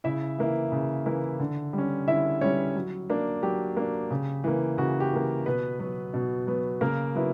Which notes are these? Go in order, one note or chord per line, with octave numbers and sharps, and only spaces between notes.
C#3 E4 E5
E3 A#3 E4
C#3
E3 A#3 E4
D3
G3
C#4
D3 E4 E5
G3 C#4 C#5
F#3
A#3 D4
F#3 G4
A#3 D4
C#3
E3 A#3
C#3 F#4
G4
E3 A#3
B2 B3 B4
F#3 B3
B2
F#3 B3
C#3 A#3 A#4
F#3 B3 E4